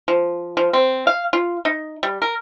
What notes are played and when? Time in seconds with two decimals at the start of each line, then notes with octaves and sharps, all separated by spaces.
0.08 F3
0.57 F3
0.73 C4
1.07 F5
1.33 F4
1.65 D#4
2.03 G3
2.22 A#4